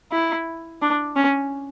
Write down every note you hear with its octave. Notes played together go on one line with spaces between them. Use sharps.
E4
D4
C#4